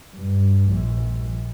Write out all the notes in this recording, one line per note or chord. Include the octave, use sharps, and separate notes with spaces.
G2
A#1